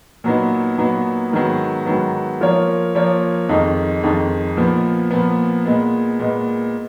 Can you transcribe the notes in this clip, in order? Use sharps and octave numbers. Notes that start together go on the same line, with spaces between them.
A#2 F#3 B3 D#4
A#2 F#3 B3 D#4
G#2 D#3 F#3 B3
G#2 D#3 F#3 B3
F3 A#3 F4 A#4 C#5
F3 A#3 F4 A#4 C#5
F2 D#3 G#3 D#4
F2 D#3 G#3 D#4
A#2 F3 B3
A#2 F3 B3
A#2 G#3 B3
A#2 G#3 B3